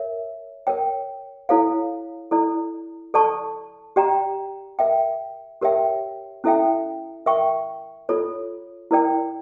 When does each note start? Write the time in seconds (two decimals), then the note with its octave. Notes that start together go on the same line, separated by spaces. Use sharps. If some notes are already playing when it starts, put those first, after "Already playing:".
Already playing: A#4 C#5 E5
0.67 A#4 C#5 G5
1.49 E4 A4 C#5 F5
2.31 E4 A4 D5
3.14 A4 D5 A5 C#6
3.96 G4 D5 G5 A#5
4.79 A#4 E5 G5
5.61 G4 A#4 C#5 E5 G5
6.44 C#4 E4 A4 E5 G5
7.26 A#4 E5 G5 C#6
8.09 F4 A4 C#5
8.91 E4 A#4 D5 G5